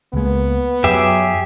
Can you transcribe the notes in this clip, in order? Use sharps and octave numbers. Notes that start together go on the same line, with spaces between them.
C#2 G#3 A#3 B3
F#2 F#3 G4 G#4 E5